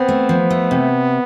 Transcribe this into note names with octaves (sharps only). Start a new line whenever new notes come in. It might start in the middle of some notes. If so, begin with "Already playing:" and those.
Already playing: B3 C4
A3
F3
A3
C3